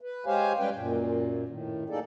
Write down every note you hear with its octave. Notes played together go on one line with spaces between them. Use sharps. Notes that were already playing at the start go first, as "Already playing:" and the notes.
B4
G#3 G4 C5 C#5 F5 G#5
G3 G#3 C#4 B4 G5
F#2 A#2
A2 D#3
F#3 A#3 D#4 G#4 A4 D5